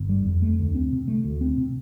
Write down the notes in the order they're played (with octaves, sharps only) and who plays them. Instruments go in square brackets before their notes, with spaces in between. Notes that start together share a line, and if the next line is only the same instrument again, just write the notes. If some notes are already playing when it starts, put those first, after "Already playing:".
Already playing: [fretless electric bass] G1
G3
F2
A3
D2
C4
C3
A3
D2
C4
C3